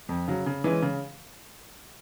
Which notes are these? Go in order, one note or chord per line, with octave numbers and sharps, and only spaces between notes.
F2
C#3 F#3
C#3
E3 G#3 C#4
C#3